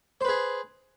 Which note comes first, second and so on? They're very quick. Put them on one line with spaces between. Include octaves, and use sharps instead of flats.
C5 B4 G#4